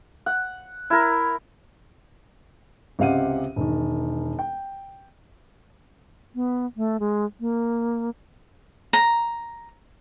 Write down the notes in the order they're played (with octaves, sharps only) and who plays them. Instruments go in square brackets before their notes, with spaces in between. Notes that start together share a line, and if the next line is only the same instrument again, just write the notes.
[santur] F#5
E4 A#4
[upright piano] C#2 C3 G4 F5 F#5 D#7
E1 D#3
G5
[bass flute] B3
A3
G#3
A#3
[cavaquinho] A#5